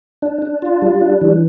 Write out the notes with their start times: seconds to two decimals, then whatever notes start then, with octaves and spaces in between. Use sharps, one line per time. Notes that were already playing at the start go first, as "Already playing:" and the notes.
0.22 D4
0.42 D4
0.62 F4
0.82 G3
1.01 D4
1.22 E3